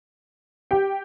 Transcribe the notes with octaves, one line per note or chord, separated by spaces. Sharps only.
G4 G5